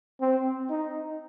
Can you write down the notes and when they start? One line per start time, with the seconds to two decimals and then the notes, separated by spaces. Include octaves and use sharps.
0.21 C4
0.70 D#4